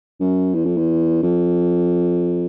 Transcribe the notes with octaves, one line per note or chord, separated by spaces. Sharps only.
F#2
E2
F2
E2
F2